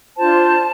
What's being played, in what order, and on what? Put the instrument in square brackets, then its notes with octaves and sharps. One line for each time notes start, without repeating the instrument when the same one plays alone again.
[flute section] D4 F4 C5 A5